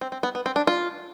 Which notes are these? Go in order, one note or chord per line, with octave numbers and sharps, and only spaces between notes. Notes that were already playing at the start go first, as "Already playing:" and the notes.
C4
C4
B3
B3
C4
D4
F4